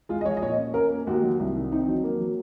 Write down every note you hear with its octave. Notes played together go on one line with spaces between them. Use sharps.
G#3 F4
D#5
F3 C#5
D#5
A#2 C#5
C#4
C#4 A#4
A#3
D#2 F#4
F#3
C2
D#3
C4 D#4
F#3
A#3
F#3